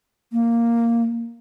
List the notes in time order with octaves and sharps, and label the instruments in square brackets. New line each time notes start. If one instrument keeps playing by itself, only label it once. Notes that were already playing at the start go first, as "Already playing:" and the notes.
[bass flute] A#3